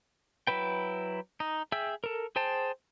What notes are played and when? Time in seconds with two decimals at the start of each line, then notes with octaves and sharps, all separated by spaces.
0.47 F#3 E4 B4 G5
1.40 D#4
1.72 G#4 E5 G5 E6
2.04 A4 A#4
2.36 G#4 C5 G5 A5